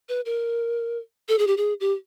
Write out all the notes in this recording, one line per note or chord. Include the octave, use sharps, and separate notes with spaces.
B4
A#4
A4
G#4
G4
G#4
G4